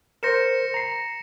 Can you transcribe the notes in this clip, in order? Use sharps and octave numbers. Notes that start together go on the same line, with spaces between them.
A#4 C5 A#6 C#7 E7
A#5 C7